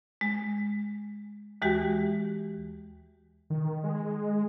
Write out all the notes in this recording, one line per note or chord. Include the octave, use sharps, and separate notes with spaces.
G#3
D#2 E3 G#3 F#4 G4
D#3
G#3